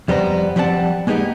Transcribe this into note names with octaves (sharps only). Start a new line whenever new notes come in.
F2 G3 B3 C5 A#5
F3 G3 C4 F#5 A5
G#3 A#3 B3 D#4 G4